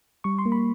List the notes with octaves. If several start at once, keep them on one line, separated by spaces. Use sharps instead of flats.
G3 C#6
C6
A#3
B5